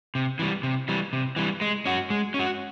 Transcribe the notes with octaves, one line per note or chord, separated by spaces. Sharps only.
C3
E3 G3
C3
E3 G3
C3
E3 G3
G#3
C#4 F#4
G#3
C#4
F#4